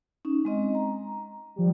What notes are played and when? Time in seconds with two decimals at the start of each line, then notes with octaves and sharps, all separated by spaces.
0.25 C#4 D#4
0.45 G#3 C4 D#5
0.75 A#5
1.56 F3 G3